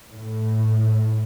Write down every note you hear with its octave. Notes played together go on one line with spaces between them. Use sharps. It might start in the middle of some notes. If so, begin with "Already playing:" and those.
A2